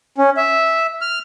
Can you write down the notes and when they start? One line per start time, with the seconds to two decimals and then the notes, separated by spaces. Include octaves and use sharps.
0.18 C#4
0.37 E5
1.01 F6